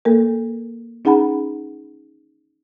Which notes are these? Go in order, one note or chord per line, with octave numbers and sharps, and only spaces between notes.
A#3 A4 A#4
C#4 D#4 G#4 F#5 A#5 B5